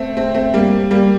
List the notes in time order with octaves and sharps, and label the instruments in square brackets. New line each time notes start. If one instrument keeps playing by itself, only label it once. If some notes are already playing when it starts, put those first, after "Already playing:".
Already playing: [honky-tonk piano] A3 C4
A3 C4
A3 C4
G3 A#3
G3 A#3